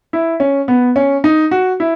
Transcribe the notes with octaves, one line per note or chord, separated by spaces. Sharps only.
E4
C#4
B3
C#4
D#4
F#4
E4